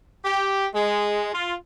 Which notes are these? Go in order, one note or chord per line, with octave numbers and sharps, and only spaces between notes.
G4
G#3
F4